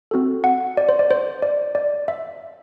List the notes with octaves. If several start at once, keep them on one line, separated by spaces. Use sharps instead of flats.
C4 F#4 A4
F#5
D5
C5
D5
C5
D5
D5
E5